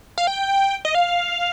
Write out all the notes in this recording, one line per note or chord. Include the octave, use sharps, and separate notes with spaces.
F5
G5
D#5
F5